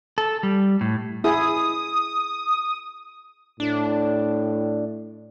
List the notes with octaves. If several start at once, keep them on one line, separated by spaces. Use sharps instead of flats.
A4
G3
A2
E4 G#4 D#6
A2 D4